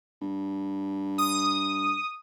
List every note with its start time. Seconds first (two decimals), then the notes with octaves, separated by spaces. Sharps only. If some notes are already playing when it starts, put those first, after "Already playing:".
0.22 G2
1.18 D#6